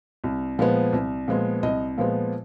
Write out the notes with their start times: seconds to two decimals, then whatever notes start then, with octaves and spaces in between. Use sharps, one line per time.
0.24 C2
0.59 A#2 F3 G#3 B3
0.93 C2
1.28 A#2 F3 G#3 B3
1.63 C2 D#5
1.98 A#2 F3 G#3 B3